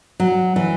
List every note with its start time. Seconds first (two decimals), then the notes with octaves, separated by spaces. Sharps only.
0.20 F#3
0.56 E3